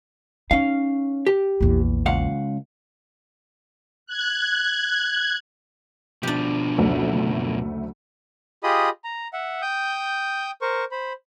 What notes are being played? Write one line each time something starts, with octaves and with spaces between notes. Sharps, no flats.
C#4 D#4 F5
G4
A#1 E2
C#2 F5 F#5
F#6 G#6
B2 F3 D4 G4
F#1 D2 A3
F4 G4 G#4 D#5 B5 D#6
A#5
E5 F#5
G5 D#6 G6
A#4 C5 C#6
C5 B5